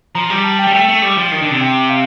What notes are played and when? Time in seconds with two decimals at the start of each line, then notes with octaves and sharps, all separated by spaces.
0.15 F3 A#5
0.30 G3
0.44 A5
0.59 G5
0.67 G3
0.74 A3 G5
0.88 A3
1.02 G3
1.17 F3
1.32 D#3
1.41 D3
1.51 C3
1.61 G5
1.90 F5